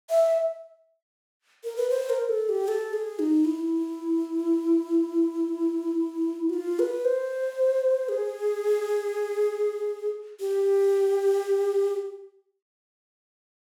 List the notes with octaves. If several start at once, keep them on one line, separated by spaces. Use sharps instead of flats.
E5
A#4
B4
C5
A#4
A4
G4
A4
G#4
D#4
E4
F#4
F4
B4
C5
G#4
G4